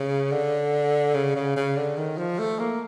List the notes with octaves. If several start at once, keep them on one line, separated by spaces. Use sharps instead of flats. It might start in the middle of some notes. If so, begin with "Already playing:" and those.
Already playing: C#3
D3
C#3
C#3
C#3
D3
D#3
F3
A3
A#3